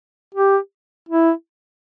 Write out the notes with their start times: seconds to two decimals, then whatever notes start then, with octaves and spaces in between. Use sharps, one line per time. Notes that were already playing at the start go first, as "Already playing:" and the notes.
0.34 G4
1.09 E4